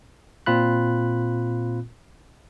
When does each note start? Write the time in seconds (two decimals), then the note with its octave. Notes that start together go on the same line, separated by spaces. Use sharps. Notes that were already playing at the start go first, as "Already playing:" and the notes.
0.46 A#2 C4 F4 B5 F#6